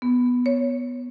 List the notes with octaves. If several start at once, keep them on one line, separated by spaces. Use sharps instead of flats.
B3
C#5